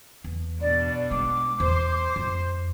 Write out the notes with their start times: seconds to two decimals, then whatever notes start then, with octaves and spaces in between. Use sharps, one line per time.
0.24 E2
0.61 B2 D4 D5
1.11 G#3 D6
1.60 E2 C5
2.16 F2